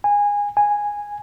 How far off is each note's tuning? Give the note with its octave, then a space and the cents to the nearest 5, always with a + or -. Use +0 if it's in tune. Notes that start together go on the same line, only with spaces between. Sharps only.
G#5 -20
G#5 -10